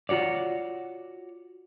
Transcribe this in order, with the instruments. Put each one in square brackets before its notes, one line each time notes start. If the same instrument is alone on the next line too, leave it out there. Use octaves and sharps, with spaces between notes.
[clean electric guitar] F4 F#4 C#5 D5